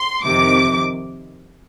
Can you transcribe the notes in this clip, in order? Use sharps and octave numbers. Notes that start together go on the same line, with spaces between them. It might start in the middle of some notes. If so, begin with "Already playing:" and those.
Already playing: C6
F2 C3 D#3 D6